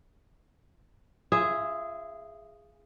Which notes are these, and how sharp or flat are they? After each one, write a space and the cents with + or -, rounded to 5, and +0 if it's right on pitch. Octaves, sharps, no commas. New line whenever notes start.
F4 -25 G#4 -5 E5 +0